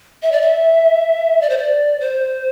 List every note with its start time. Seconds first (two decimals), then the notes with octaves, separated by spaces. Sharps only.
0.23 E5
0.32 D5
0.42 E5
1.42 D5
1.50 C5
1.57 D5
2.01 C5